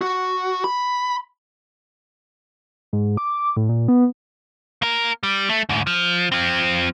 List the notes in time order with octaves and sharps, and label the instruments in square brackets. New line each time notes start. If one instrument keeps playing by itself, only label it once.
[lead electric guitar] F#4
B5
[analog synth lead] G#2
D6
A2
A#2
B3
[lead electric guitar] A#3 A#4
G3
A3
D2 G#2
F3
F3 C4